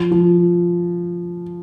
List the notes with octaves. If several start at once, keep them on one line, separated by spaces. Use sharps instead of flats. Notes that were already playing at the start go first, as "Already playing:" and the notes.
Already playing: F3
F3